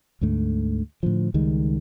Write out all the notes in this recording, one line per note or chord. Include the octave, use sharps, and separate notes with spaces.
D2 G#2 D3 A3
A2 D3 F3
C#2 D#3 G3 G#3